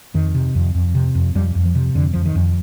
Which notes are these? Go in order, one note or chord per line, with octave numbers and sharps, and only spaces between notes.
F2 D#3
C3
F2
F2
C3
F2
F2 G3
F2
F3
C3
F2 D3
F2 F3
D#3
F2